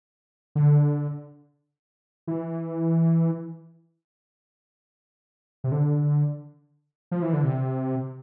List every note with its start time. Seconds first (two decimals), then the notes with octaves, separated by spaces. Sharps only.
0.55 D3
2.27 E3
5.64 C3
5.72 D3
7.11 F3
7.22 E3
7.33 D3
7.44 C3